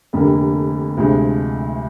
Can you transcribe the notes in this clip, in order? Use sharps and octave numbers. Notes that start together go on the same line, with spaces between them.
F1 F2 D3 G3 A#3
D2 C3 F3 G#3